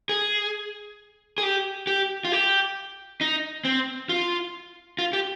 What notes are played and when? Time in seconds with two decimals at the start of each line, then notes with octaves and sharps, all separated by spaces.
0.09 G#4
1.38 G#4
1.43 G4
1.87 G4
2.25 F4
2.32 G4
3.21 D#4
3.65 C4
4.09 F4
4.99 F4
5.13 G4